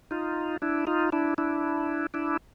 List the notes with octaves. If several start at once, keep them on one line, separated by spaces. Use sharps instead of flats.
D#4 F4
D4 E4
D#4 F4
D4 E4
D4 E4
D4 E4